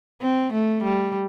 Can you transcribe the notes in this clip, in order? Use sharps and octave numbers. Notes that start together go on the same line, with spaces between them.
C4
A3
G3